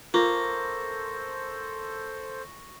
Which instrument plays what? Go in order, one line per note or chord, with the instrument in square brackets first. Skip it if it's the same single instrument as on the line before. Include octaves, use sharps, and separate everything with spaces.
[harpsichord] A#3 [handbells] F4 [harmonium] A4 C5 [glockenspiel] C#6 A#6